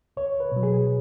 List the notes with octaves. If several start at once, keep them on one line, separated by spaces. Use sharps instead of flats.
C#2 C#5
B4
B2 F#3
G#4